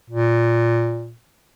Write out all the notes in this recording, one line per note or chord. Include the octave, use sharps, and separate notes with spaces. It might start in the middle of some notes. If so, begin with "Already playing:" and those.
A#2